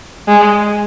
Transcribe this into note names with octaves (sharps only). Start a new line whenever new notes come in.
G#3